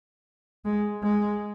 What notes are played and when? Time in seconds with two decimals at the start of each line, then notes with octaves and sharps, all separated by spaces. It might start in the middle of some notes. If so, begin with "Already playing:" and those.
0.65 G#3
1.03 G#3